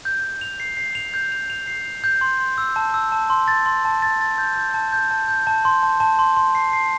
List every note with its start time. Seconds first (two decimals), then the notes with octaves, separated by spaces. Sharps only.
0.05 G6
0.24 G6
0.41 F7
0.60 C7
0.77 C7
0.95 F7
1.14 G6
1.32 F7
1.50 F7
1.67 C7
1.85 F7
2.04 G6
2.21 C6
2.40 C6
2.58 E6
2.76 A5
2.94 E6
3.12 A5
3.30 C6
3.48 A6
3.66 C6
3.85 A5
4.02 A6
4.21 A6
4.38 G6
4.56 G6
4.74 A5
4.93 G6
5.11 A5
5.28 G6
5.47 A5
5.65 C6
5.83 A5
6.00 A5
6.19 C6
6.37 C6
6.55 C7
6.73 C7